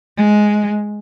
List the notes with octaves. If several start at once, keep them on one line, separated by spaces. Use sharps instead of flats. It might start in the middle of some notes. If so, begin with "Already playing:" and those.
G#3